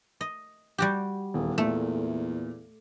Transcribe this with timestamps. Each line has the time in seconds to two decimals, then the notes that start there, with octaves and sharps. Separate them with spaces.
0.21 D#5
0.78 G3 F#4 G4
1.34 D#1 E2
1.58 E2 A#2 A3